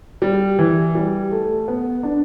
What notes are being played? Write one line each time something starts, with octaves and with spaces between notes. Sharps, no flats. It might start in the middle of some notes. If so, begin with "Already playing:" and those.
G3
E3
G3
A3
B3
D4